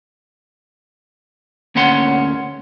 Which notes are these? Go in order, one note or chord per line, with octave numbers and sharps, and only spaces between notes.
D2 A#3 C#4 C#5 F#5 C6